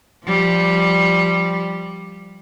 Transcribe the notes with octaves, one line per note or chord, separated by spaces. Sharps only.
F3 G3